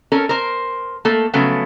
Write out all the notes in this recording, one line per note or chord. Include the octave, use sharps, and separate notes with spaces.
C#4 A4 A#4
A#4 C5
A3 A#3 A4
C#3 F3 F#3 A3 B3